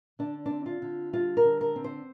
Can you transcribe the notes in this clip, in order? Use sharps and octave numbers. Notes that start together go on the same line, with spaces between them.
D3 D4
C4 D4
F4
D3
G3 F4
A#4
D3
A#4
C4
C5